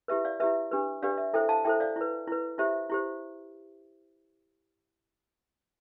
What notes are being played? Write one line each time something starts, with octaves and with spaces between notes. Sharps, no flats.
E4 G4 B4 E5
D5 F5
E4 G4 B4 E5
D4 G4 B4
D4 G4 B4 D5 F5
E5
E4 A4 C5 E5 G5
F5 A5
E4 A4 C5 E5 G5
D5 F5
E4 B4
E4 B4
E4 G4 C5 E5
E4 G4 C5